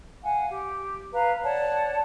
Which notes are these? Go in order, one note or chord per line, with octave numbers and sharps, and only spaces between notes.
F5 F#5 G#5
G4
B4 F5 A#5
C#5 D5 F#5 A5